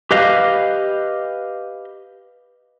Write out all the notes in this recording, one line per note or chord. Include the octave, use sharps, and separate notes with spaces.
G4 B4 D#5 F5